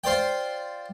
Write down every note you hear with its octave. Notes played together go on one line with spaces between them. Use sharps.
F4 C5 D5 G5